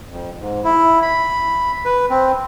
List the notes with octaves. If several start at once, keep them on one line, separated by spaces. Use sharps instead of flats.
F2
G#2
E4
B5
B4
C4